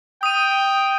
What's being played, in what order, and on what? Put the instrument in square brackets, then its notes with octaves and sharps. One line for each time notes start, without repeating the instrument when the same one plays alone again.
[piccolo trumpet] G5 [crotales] D#6 D#7